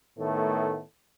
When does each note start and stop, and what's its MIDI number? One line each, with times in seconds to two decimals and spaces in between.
0.19 0.81 45
0.19 0.81 51
0.19 0.81 57
0.19 0.81 59